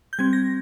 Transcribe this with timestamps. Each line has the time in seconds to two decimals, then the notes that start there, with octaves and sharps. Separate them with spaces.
0.13 G6
0.19 G3 C4 G#6
0.33 A#6